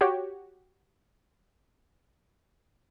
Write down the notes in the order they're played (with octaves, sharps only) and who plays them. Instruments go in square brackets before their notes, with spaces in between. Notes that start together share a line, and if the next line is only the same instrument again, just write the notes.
[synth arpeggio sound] F#4 G4 C#5